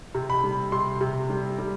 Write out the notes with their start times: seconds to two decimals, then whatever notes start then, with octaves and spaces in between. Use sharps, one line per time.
0.15 C3
0.30 B5
0.43 G3
0.72 C3 C6
1.01 C3
1.29 G3
1.58 G3